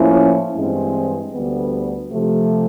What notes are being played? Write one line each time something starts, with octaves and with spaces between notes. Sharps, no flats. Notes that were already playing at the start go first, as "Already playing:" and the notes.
Already playing: A2 F3 A#3 C#4 E4
G2 E3 G#3 C4
D2 D3 G3 B3
C3 F3 A3